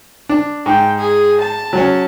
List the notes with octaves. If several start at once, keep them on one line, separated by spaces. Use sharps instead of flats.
D4
G#2 G5
G#4
A5
F#3 C#4